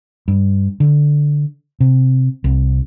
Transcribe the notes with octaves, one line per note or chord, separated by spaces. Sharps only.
G2
D3
C3
C2